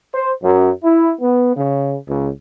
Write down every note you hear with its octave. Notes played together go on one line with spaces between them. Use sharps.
C5
F#2
E4
B3
C#3
C#2